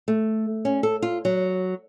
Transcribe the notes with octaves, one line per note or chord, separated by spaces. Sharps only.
A3
C#4
A4
F4
F#3